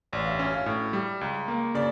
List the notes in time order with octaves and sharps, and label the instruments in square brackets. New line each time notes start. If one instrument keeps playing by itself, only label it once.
[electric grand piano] A1 [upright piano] D5
[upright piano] F5
E5
[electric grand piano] C#4 [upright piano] E5
[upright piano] F5
[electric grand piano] A2 [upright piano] E5
[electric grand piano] G3
C#2
A#3
[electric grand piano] C#3 [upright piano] D5